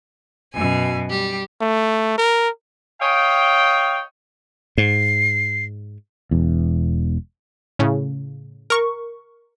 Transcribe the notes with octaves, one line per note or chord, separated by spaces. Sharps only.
F#2 B2 G#5
G3 G4
A3
A#4
C#5 D#5 F5 G5
G#2 C7
E1 E2
A2 C#3
A#4 C#6